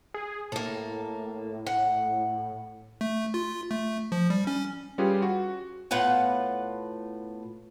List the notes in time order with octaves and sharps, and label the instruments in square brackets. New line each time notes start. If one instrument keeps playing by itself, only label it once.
[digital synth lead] G#4
[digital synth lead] A2 [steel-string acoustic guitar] A#3 A4
[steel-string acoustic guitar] F#5
[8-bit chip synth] A3
F4
A3
F3
G3
C#4
[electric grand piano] G3 C#4 F4 G4 G#4 B4
F#4
[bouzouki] A2 B3 F4 F#5